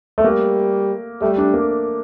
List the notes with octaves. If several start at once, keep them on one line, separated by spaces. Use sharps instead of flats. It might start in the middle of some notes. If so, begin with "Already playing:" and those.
A3
G3 A#3
G3 A3
D4
A#3